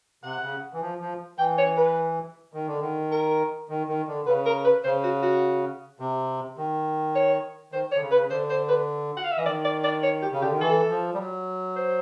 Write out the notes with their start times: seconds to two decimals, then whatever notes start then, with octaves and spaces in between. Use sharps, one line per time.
0.23 C3 F#5
0.42 C#3
0.73 E3
0.81 F3
1.00 F3
1.38 E3 G5
1.58 C#5
1.77 B4
2.53 D#3
2.67 D3
2.80 D#3
3.11 A#4
3.69 D#3
3.88 D#3
4.08 D3
4.27 C#3 B4
4.46 A#4
4.65 B4
4.84 C#3 C5
5.03 F#4
5.23 F#4
6.00 C3
6.57 D#3
7.15 C#5
7.72 D#3 C5
7.92 C#5
7.95 D3
8.01 C#3
8.11 B4
8.16 C#3
8.30 D3 C5
8.50 C5
8.68 B4
9.17 F#5
9.24 F5
9.31 E5
9.37 E3 D#5
9.46 D#3 D5
9.65 D5
9.84 D5
10.03 C#5
10.22 G4
10.32 C#3
10.42 D3 G4
10.51 D#3
10.61 E3 A4
10.90 F3
11.14 G3
11.18 F#3
11.76 C5